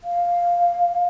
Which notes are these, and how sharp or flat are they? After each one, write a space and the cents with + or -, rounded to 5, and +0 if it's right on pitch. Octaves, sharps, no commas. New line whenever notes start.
F5 +0